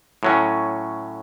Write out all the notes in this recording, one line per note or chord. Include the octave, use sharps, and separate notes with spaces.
A2 F#3 C#4